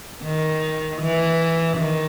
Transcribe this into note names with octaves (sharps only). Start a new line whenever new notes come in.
D#3
E3
D#3